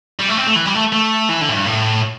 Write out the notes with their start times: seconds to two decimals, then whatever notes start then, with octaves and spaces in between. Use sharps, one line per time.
0.19 G3
0.29 A3
0.37 C4
0.47 A3
0.56 E3
0.65 G3
0.75 A3
0.92 A3
1.29 E3
1.41 D3
1.48 A2
1.54 G2
1.66 A2